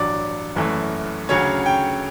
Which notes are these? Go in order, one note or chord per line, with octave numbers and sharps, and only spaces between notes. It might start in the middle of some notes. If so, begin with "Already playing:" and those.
Already playing: A1 G2 F#3 D5
F#1 F#2 E3 A3
D2 C#3 F#3 C#4 C#5
G5